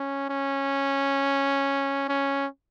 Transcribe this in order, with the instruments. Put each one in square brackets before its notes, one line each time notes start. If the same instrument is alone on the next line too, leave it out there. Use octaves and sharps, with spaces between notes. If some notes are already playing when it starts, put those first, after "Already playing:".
Already playing: [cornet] C#4
C#4
C#4